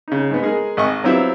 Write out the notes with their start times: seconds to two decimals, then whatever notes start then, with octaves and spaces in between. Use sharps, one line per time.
0.08 C#3 D#4
0.31 G#2 B3
0.42 G#3 G#4 A#4
0.77 G#1 D#5 C#6
1.04 F#3 B3 C4 E4 F4 G4